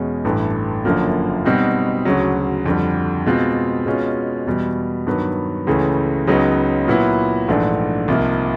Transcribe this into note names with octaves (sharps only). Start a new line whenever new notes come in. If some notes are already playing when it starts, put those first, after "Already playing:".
Already playing: E2 B2 G#3 C#4
A1 G2 E3 A3
F#1 F#2 D3 F3 A#3
B2 G3 C4 D#4 F#4
D2 C#3 F#3
F2 D3 G3
B2 G#3 C4 F4
B2 G#3 C#4 F4
E2 B2 G3
G2 D#3 F#3 B3
C#2 C#3 E3 A3
C#2 C#3 F#3 B3 D#4
A#2 F#3 B3 E4
A#1 G#2 E3 A3 D4
C2 C3 F3 A#3 D#4